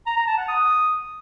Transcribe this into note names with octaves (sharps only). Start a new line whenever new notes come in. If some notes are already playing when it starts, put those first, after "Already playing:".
A#5
A#5
A5
F#5
D#6